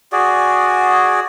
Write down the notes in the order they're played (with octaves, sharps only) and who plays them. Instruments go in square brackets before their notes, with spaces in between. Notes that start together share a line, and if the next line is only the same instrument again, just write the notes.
[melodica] F#4 G#4 D5